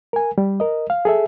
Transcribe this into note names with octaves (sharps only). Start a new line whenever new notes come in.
A#4 G#5
G3
A#4 D#5
F5
G#4 A4 E5